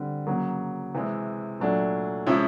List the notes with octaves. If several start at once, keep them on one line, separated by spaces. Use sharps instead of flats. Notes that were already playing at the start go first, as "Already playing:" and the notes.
Already playing: D3 G3 C4
C#3 F#3 A#3
C3 E3 G#3
A#2 F#3 A3 D4
C3 F3 G#3 C#4 E4